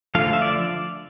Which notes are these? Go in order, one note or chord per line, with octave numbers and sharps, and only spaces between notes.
D3 F3 A3 F5
E5
D5